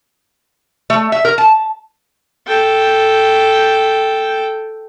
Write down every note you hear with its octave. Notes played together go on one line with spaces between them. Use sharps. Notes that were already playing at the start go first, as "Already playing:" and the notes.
A3
E5
A#4
A5
A4 G5